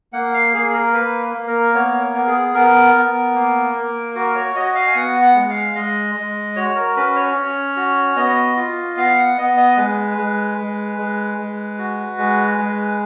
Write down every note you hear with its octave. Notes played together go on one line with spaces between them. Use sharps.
A#3 F#5
F5
A#3 G#4
A#4
A#3 B4
A#3
A#4
B3 C#5
A#4
B3
G#4
B3 A#4
B3
A#3
A#3
F#4 A#4
C#5
F#4 D#5
F5
G#5
B3 F#5
F#5
G#3
F5
G#3 D#5
G#3
F#4 C#5
A#4
C#4 B4
C#5
C#4
F#4
B3 D#5
F4
B3 F5
F#5
B3 D#5
D#5
G#3 B4
G#3
G#3
G#3
G#3
F#4
G#3
G#3